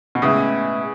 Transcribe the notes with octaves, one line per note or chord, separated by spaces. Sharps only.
B2
A2 C#3 G#3 B3 E4